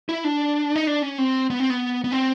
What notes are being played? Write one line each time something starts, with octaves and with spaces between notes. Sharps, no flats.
E4
D4
D#4
D4
C#4
C4
B3
C4
B3
B3
C4